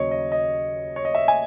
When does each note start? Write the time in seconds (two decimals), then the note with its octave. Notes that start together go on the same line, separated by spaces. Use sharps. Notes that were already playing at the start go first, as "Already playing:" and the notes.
Already playing: D#2 C#3 F#3 C#5 D#5
0.11 D#5
0.32 D#5
0.96 C#5
1.05 D#5
1.15 E5
1.28 G#5